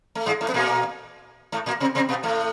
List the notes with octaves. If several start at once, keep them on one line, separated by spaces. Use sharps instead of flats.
A3
G#2 G#3
A2 A3
B3
A#2 A#3
A2 A3
A#2 A#3
C3 C4
C3 C4
B2 B3
A2 A3